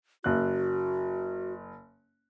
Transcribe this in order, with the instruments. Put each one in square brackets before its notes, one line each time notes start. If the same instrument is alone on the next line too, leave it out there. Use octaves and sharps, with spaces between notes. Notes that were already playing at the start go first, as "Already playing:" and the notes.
[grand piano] F#1 F#6 [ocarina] F#4